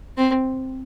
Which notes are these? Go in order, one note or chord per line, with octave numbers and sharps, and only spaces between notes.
C4